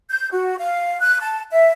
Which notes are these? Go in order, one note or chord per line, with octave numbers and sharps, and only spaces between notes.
G6
F#4
F5
F#6
A5
E5